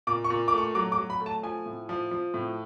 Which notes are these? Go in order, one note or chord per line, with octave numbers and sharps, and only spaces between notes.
A#2 D6
C#6
A#2
A3 D6
C#6
F#3 D6
D6
F#3
B5
A3
A5
F3 G#5
A2
F3
F3
A2